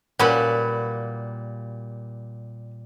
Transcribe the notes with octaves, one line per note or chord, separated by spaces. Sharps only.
A#2 F#3 G3 C#4 B4 B5